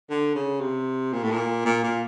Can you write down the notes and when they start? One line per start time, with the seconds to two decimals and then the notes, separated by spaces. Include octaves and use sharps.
0.10 D3
0.35 C#3
0.61 C3
1.13 A#2
1.23 A2
1.31 A#2
1.65 A#2
1.83 A#2